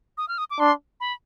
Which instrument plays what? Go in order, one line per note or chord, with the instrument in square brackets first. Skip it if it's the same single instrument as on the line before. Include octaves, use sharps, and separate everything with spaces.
[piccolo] D#6
F6
D#6
D6
[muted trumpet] D4 [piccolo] C6
[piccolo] B5